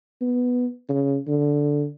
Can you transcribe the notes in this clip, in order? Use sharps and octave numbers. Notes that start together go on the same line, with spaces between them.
B3
C#3
D3